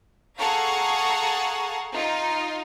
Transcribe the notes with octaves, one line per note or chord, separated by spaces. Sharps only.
G#4 A4 F5 F#5 A#5 C#6
D#4 F4